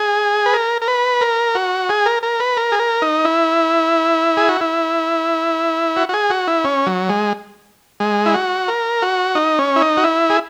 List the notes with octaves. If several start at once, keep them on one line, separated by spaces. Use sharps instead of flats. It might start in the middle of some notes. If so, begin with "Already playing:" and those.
Already playing: G#4
B4
A#4
A#4
B4
A#4
F#4
G#4
A#4
A#4
B4
A#4
G#4
A#4
D#4
E4
G#4
F#4
E4
F#4
F#4
G#4
F#4
E4
C#4
F#3
G#3
G#3
E4
F#4
A#4
F#4
D#4
C#4
E4
D#4
F#4
E4
G#4